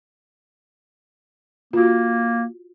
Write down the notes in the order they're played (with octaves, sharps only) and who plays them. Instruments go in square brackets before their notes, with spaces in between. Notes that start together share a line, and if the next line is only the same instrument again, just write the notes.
[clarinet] A#3 [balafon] F4 F#4